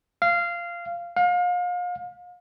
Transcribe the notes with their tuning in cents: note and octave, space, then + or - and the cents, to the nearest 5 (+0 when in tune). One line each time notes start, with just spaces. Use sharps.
F5 -15
F5 +35